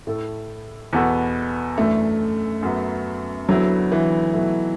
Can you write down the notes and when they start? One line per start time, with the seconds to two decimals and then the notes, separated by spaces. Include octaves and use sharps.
0.07 A2 A3 E4 A4
0.93 E2 B2 B3 F#4 A4
1.78 F#2 E3 A3 D4 A4
2.63 F#2 F#3 B3
3.48 D2 D3 F#3 B3 E4
3.92 E3
4.34 B2 F#3 A3 E4